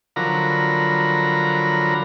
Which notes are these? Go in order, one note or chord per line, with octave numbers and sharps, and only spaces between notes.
D3 F3 F#3 A#4 A#5 B5